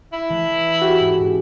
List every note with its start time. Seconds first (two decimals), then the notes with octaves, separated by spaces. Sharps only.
0.13 E4
0.30 E3 A3 B6
0.82 F#4 G4
1.00 G#2 C#4
1.20 G#2